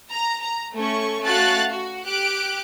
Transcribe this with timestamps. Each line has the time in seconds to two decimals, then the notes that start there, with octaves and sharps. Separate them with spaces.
0.11 A#5
0.41 A#5
0.75 A3 C#4 C#6
1.22 A3 C#4 F#4 F5 F#6 A6
1.70 F#4
2.05 G4 F#6 D7